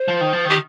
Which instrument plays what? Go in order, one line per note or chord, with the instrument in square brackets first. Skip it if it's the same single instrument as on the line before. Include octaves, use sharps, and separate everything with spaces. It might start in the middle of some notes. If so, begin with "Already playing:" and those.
Already playing: [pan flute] C5
[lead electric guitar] F3
D#3
F3
[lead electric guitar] D#3 [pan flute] G4